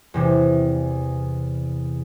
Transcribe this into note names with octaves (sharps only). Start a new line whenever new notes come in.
E2 C3 E3